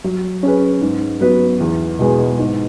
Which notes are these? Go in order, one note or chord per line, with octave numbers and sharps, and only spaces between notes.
F#3
C#4 G#4 B4
G#2
F#3 B3 F#4 B4
E2
B2 G#3 B3 G#4
G#2